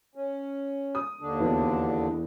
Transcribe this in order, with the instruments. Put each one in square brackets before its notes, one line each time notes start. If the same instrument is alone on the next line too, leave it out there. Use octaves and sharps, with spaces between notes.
[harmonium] C#4
[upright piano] D#6
[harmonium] D#2 D3 D4
[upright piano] E2 E3 F#4